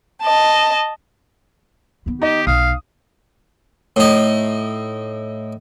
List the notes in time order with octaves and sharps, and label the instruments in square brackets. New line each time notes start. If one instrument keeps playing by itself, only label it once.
[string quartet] D#5 A5
[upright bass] D#3 B3
[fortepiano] D#4 D#5 [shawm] G4
[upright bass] B1 [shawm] F5 [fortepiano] D#6
[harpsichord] A2 D#4